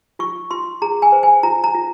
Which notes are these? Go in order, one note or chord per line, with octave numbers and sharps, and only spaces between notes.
F4 C#6
F4 C6
G#4 A#5
G#5
C5
G#5
F4 A#5
A#5
F4